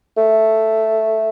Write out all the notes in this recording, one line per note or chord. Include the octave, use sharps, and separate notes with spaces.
A3